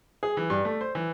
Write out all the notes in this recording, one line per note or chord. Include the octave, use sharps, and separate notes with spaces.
G#4
E3
G2
A3
C5
E3